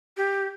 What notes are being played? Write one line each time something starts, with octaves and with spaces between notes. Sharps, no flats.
G4